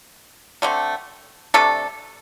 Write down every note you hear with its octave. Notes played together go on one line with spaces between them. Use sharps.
D3 A3 C4
C3 A3 D4 A4